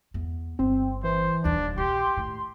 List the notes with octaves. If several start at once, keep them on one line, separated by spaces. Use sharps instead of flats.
E2 B3
G1 C4
E3 C5
D#1 D#2 D4
A#1 D#2 G4 C6
D#2 A2